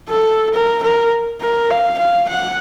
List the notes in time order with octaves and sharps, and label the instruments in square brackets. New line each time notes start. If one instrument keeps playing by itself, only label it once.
[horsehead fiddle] A4
A#4
A#4
A#4
F5
F5
F#5